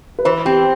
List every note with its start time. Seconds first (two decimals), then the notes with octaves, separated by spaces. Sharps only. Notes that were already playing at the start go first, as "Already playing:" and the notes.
0.19 B4
0.25 E3 C5
0.45 C4 G4